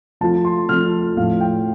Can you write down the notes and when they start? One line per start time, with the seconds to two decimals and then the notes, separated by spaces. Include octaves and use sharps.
0.21 F3 A3 C4 F4 A5
0.45 C6
0.69 F3 A3 C4 F4 F6
1.17 A2 F3 A3 F5
1.40 G5